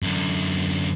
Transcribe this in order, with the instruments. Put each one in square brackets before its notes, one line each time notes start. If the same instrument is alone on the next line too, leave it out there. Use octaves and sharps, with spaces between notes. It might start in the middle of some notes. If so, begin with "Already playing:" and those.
[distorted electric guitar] F#2 D3